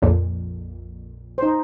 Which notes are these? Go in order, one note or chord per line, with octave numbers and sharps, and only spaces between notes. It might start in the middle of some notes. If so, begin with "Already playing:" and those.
A#1 F2 A#2
D#4 C5